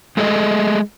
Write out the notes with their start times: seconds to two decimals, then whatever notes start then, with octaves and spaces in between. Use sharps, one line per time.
0.17 G#3 A3 G#4 A4 D#5